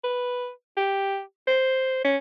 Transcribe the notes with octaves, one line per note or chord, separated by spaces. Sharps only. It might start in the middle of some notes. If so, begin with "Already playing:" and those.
B4
G4
C5
C#4